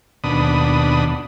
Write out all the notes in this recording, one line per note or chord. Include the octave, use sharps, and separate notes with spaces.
D#2 B2 D4 B5 D#6